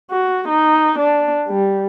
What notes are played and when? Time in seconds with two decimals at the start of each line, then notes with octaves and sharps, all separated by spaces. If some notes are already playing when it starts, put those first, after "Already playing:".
0.11 F#4
0.49 D#4
0.99 D4
1.48 G3